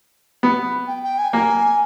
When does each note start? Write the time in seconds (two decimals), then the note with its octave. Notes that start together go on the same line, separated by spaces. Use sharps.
0.43 B3
0.87 G5
1.03 G5
1.19 G#5
1.33 A#3 G#5